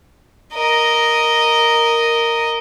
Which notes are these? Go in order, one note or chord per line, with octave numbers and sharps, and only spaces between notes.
A#4 D#5